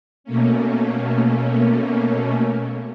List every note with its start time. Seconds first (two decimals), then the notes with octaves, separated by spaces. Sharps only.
0.24 B2 A3 A#3 C#4